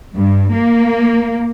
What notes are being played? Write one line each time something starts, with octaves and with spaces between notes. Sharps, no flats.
G2
A#3